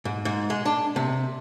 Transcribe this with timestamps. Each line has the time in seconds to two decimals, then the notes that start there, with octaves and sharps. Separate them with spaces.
0.05 G#2
0.25 G#2
0.50 G#3
0.66 D4
0.96 C3